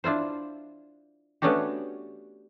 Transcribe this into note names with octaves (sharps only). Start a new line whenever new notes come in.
D4 E4 F4 C5
A3 B3 C#4 D4 F#4 G4